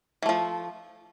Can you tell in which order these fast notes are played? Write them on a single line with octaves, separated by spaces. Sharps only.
E3 A3 F3